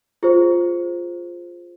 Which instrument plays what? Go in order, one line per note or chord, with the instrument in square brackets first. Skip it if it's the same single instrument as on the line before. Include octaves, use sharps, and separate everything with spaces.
[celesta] F4 G#4 C5